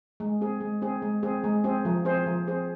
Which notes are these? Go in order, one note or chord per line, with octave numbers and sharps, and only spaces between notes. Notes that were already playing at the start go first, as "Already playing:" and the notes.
G#3
C4 G#4
G#3
C4 G#4
G#3
C4 G#4
G#3
C4 G#4
F3
C4 G#4 C5
F3
C4 G#4 C5